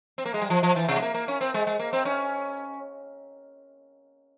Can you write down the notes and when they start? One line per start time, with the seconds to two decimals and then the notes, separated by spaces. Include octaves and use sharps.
0.18 C4
0.26 A#3
0.34 G#3
0.42 G3
0.50 F3
0.63 F3
0.76 E3
0.88 C3
0.96 G#3
1.02 A#3
1.14 A#3
1.28 C#4
1.41 C4
1.54 G#3
1.67 G#3
1.79 A#3
1.93 C4
2.05 C#4